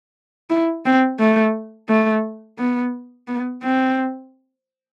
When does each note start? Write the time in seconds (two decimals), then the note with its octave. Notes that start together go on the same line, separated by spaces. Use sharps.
0.50 E4
0.86 C4
1.19 A3
1.89 A3
2.58 B3
3.28 B3
3.63 C4